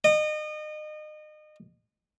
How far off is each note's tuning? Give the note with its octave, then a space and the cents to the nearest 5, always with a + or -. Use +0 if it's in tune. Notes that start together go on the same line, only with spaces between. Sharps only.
D#5 -30